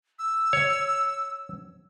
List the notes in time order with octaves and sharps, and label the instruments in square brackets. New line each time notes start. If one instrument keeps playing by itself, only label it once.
[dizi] E6
[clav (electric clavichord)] C#5